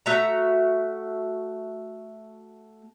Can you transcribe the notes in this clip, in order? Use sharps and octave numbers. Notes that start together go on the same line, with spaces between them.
A3 F#4 E5 A#5